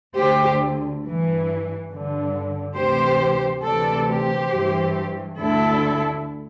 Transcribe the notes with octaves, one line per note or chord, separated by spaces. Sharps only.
D2 D3 G4 C5
G2 E3
G2 D3
D2 C3 E3 G4 C5
D2 C3 E3 A4 D5
G4 C5
G2 E3
D2 D3 E4 A4